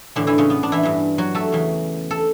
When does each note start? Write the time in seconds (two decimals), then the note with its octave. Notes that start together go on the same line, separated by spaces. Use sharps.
0.16 A2 D3 E3 D4
0.27 E3 E4
0.38 C#3 C#4
0.50 B3
0.63 D4
0.72 E3 E4
0.83 G2 E3
1.18 F#3 F#4
1.35 A3 A4
1.52 E2 C#3 E3
2.11 A4